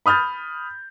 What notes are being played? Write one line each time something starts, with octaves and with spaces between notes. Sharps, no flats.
B5 D#6 F6 G6 A6